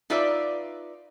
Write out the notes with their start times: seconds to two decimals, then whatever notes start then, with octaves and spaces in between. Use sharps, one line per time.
0.10 D#4 F4 B4 D5 E5